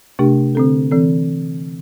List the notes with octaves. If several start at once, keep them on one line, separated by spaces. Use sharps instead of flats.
C3 A3 D4 G4
D3 C4 A4
E3 C4 A4